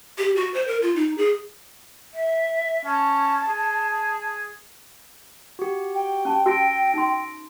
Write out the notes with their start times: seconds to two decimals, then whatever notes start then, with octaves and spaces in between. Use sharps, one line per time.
0.18 G4
0.36 F#4
0.54 C5
0.68 A#4
0.82 F4
0.96 D#4
1.18 G#4
2.14 E5
2.85 C#4 A5
3.48 G#4
5.59 F#4 G4
5.94 G5
6.25 C#4 A5
6.46 F#4 E6 A#6 D7
6.94 D#4 C6